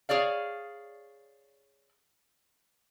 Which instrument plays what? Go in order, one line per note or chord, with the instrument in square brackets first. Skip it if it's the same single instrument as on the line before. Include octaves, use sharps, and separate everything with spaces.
[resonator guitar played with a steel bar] G#4 C#5 D5 F5